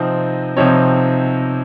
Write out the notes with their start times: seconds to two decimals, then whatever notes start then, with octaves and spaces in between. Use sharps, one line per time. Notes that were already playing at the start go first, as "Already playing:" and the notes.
Already playing: C3 F3 C4 D#4 D#5
0.56 C3 F3 C4 D#4 C#5